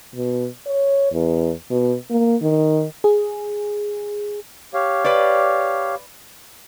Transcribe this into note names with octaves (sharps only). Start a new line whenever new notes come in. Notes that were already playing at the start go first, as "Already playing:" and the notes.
B2
C#5
E2
B2
A#3
D#3
G#4
G4 C#5 F5
B4 D5